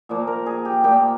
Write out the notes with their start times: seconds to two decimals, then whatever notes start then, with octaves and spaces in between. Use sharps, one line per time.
0.09 A#2 F3 A#3
0.27 A#4
0.46 G#4
0.65 G4
0.84 A#2 F3 A#3 G4